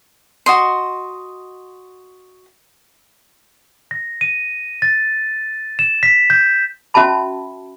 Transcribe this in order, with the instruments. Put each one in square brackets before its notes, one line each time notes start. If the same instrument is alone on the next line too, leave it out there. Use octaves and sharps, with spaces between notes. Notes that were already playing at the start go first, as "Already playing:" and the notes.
[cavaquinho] F#4 D#5 C6
[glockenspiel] A#6
D#7
A6
E7
B6
G6
[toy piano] C#4 F#4 E5 A5 B5